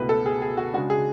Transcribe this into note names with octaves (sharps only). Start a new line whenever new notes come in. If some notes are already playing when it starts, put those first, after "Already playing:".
Already playing: C#2 B2 A3 E4 B4
A4
G#4
G#4
F#4
C#3 G#3 D4 F#4
G#4